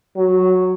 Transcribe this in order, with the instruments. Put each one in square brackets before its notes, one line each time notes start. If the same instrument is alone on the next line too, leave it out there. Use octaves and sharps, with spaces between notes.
[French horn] F#3